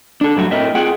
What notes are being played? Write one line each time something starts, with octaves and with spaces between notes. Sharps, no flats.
D4 A4
G2 F#3 A3 F#4
A2 A3 C4 A#4 D#5 E5
C4 F4 G#4 F#5 G5